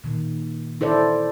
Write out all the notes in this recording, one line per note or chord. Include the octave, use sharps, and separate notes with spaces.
A#2 D#3
E4 A4 C5 D5